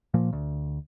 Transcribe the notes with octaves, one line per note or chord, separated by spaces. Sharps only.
A#2 F3 A#3
D2